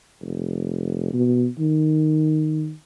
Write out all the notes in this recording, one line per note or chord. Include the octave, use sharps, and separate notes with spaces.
F1
B2
D#3